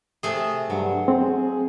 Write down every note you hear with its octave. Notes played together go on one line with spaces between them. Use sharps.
C3 A3 G#4
G2 F#3
C4 G#4